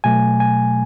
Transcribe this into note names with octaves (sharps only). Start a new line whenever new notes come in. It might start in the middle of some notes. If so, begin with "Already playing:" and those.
B2 F#3 A3 G#5
G#5